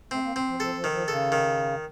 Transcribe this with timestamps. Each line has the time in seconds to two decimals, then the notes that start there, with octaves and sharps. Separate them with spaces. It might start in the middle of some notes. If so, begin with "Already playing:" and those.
0.11 A3 C4
0.24 A#3
0.36 C4
0.48 F3
0.60 F3 A4
0.75 F3
0.84 D#3
0.92 F3
1.08 C#3 A4
1.32 D#3